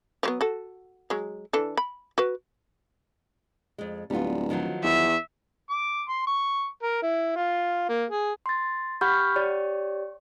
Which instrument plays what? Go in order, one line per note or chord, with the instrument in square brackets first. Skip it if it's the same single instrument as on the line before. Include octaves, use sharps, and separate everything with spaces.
[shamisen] F3 F#3 B3
F#4 A4
F#3 G#3
E3 D4 A4
B5
F#4 B4
[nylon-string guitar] F2 G#3
[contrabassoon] D1 [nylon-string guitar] G3 B3 F4
[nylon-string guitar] D#3 F3 F#3
[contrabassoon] E2 [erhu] E5
[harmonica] D6
C6
C#6
A#4
E4
F4
A#3
G#4
[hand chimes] C6 A6
G4 F#5 B5 C#6 F6 G6
G4 C#5 D5